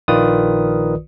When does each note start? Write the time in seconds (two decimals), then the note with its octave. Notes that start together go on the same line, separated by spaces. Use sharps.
0.08 A#1 D#3 F4 B4 D5 D#6